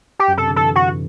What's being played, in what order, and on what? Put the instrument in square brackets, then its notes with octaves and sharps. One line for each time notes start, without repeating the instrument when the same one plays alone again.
[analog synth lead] G4
[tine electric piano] F#2
[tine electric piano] C3 [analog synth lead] A4
[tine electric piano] D3
[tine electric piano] E3 [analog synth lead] A4
[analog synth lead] F#4